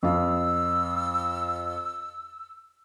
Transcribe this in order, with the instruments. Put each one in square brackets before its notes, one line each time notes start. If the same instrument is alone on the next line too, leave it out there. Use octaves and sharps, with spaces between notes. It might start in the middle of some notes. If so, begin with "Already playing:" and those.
[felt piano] F2 F4 [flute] E6